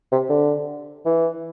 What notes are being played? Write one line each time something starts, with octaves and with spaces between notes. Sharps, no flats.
C3
D3
E3